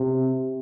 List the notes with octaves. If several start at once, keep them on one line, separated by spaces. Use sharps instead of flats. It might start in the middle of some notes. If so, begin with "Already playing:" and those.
Already playing: C3